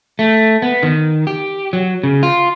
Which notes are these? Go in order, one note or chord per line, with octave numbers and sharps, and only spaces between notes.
A3
B3
D#3
G4
F#3
C#3
F4